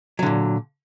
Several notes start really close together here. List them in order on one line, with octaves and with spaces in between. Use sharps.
F#3 D3 A#2